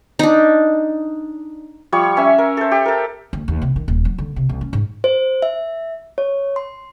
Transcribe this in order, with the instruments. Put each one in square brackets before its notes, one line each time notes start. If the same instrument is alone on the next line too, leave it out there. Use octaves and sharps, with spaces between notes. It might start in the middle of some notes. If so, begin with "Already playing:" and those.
[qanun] D4 D#4
[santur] F3 G3 C#5 C#6
C#4 E5 G#5
A#4
A4 C5
G4
A4 A#4
[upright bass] D2
D#2
C3
D#3
D#1
F#3
D3
C3
C2
C#4
G#2
[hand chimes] C5
E5
C#5
C6